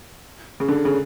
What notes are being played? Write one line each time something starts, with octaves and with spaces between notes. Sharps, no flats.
C#3
D3
C#3